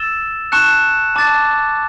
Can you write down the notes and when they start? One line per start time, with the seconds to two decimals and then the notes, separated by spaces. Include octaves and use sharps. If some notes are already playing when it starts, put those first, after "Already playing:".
Already playing: E6 A6 E7 G7
0.52 A5 C#6 F#6 C#7 E7
1.16 A5 D6 A6